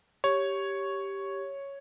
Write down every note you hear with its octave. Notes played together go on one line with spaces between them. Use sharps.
G4 C#5